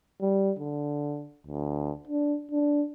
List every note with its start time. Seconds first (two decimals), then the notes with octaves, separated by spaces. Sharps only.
0.21 G3
0.59 D3
1.47 D2
2.08 D4
2.52 D4